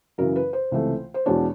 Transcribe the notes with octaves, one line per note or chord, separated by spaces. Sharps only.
F#2 C#3 E3 A#4
B4
C5
C#2 C3 E3 A3
C5
E2 B2 G#3 B3 D4 C#5